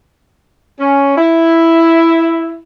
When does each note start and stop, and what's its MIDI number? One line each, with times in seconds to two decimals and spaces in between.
0.78 1.14 61
1.17 2.59 64